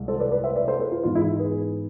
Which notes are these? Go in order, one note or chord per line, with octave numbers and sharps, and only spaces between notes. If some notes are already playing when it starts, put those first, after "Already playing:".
Already playing: C2 G#3
A4 C5
B4 D5
B4 D5
C5 E5
B4 D5
A4 C5
G#4 B4
F4
G#2 E3 B3 F4
E4 G#4
G#4 B4